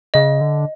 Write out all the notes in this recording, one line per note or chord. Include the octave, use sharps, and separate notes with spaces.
C#3 D#5
D3